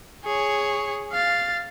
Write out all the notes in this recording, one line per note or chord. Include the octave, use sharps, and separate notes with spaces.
G#4 C#5
F5 A6